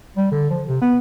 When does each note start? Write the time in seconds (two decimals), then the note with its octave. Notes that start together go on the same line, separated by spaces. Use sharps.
0.17 G3
0.32 D3
0.50 F3
0.67 C3
0.82 B3